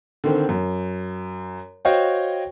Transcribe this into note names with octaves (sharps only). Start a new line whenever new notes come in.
D3 D#3 C4
F#2
F#4 C5 C#5 D#5 F5 G5